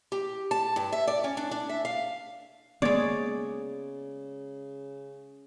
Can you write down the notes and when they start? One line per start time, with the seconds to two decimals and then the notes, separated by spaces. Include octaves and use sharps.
0.12 G4
0.51 A5
0.76 G2
0.92 E5
1.07 D5
1.24 C#4
1.37 D4
1.51 D4
1.69 E5
1.85 F5
2.82 C#3 G#3 A#3 B3 C#4 C#5 D5